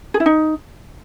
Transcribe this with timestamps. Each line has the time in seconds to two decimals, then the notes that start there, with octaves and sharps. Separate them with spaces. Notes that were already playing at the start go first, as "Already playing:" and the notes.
0.14 G#4
0.20 E4
0.26 D#4